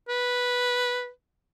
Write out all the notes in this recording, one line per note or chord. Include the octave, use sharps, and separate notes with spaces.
B4